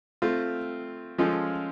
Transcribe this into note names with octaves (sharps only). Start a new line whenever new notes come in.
A3 C4 F4
F3 G#3 C#4 F4 A4